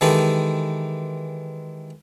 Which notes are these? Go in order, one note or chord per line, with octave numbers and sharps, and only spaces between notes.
D#3 E3 G#3 D#4 G4 A4